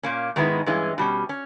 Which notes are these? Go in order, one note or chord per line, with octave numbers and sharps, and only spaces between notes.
A#2 A#3 C#4
G#2 D#3 G#3 B3 E4
G2 E3 G#3 C#4
B2 G3 C#4
C#4